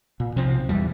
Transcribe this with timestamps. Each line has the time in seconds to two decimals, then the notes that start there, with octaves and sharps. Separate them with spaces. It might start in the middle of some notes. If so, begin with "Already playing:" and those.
0.20 A#2
0.36 B1 C3 F3 C4
0.69 E2 G#2 E3 G3